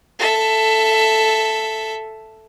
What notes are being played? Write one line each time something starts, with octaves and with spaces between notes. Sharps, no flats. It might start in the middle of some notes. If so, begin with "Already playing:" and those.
A4 E5